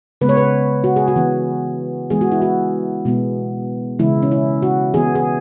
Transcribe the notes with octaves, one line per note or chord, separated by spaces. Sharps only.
C#3 G#3 B3 B4
C#5
B4
F#4
G#4
F#4
E3 B3
E3 G#3 B3 G#4
F#4
E4
F#4
B2 G#3 B3
C#3 E3 G#3 E4
C#4
E4
F#4
E3 B3 G#4
G#4